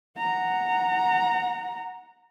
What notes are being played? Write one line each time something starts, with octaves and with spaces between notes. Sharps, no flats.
F#5 A#5